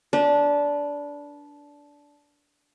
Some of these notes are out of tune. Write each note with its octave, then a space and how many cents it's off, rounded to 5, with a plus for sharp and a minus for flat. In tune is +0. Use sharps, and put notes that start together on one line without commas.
D4 -15 B4 -30